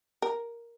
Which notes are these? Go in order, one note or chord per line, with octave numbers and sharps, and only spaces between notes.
A#4